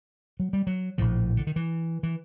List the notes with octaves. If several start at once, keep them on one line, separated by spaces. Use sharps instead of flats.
F#3
G3
F#3
A#1 A2 F3
D3
D#3
E3
E3